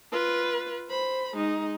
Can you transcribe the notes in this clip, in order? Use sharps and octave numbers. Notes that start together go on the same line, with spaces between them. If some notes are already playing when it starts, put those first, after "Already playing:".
F4 B4
C5 B5
G#3 D#4